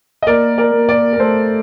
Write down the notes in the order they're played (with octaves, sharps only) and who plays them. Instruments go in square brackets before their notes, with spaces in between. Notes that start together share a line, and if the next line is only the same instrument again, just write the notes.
[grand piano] D#5
[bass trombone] A#3 [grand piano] A#4 D5
[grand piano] A#4 D5
[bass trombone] A#3
[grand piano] A#4 D5
A#4
[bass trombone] A3 [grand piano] A4 C5